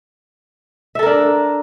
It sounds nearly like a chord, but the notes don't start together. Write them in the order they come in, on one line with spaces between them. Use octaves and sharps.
E5 A4 A#4 D4